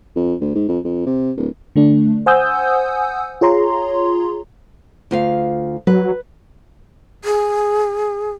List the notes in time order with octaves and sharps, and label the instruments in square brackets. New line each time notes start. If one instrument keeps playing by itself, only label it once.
[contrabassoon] F2
D2
G#2
F2
F2
C3
D1
[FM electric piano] D3 A3 D4
C5 F#5 G#5 D#6 E6 G6
F4 G#4 C#5 A#5 C6
[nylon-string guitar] D2 F4 F5
[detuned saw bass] F#3 [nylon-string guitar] B4
[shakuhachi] G#4